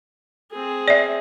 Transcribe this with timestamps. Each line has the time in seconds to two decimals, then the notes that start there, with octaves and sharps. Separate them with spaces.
0.51 C4 G#4
0.88 D5 E5